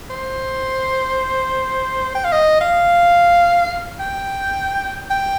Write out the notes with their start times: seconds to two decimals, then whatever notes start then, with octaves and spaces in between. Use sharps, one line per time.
0.10 C5
2.15 G5
2.24 F5
2.32 D#5
2.61 F5
4.00 G5
5.11 G5